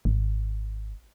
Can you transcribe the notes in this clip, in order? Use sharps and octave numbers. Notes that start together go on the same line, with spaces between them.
G#1